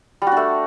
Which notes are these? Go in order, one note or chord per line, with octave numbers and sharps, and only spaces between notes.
G3
F#4
D4
A3